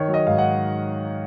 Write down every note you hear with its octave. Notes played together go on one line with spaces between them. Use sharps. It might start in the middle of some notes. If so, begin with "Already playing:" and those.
Already playing: D#3 C#5
F#3
D#5
G#2 F5
F#5